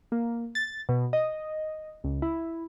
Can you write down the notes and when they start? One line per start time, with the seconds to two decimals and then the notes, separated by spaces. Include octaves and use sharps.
0.12 A#3
0.55 A6
0.89 B2
1.13 D#5
2.04 C#2
2.22 E4